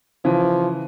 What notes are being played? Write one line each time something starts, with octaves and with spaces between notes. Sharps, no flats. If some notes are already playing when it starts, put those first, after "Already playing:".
C#3 E3 F3